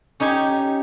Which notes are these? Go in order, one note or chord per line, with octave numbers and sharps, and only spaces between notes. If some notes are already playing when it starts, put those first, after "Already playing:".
C#4 D#4 G4 G#5